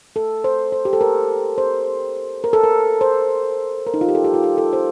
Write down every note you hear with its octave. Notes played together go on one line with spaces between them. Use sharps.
A4
C5
C5
G4
A4
A#4
C5
A#4
A4
A#4
C5
A#4
D#4
F4
G4
A4
G4
F4
G4
A4
C5